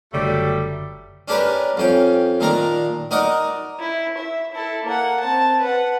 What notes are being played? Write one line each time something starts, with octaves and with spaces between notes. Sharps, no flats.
F#1 D3 F#3 G3 A3
C#4 D4 G4 A#4 B4
F2 C#4 G5
A#2 D#3 D4 A#4 A#5
D#4 F#4 A#4 D5 D#5 F#5
E4
E5
E4 A4
A#3 F#5
C4 A5
B4 F#5